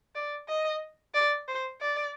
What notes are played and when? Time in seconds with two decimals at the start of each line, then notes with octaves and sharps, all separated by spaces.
0.15 D5
0.49 D#5
1.14 D5
1.48 C5
1.81 D5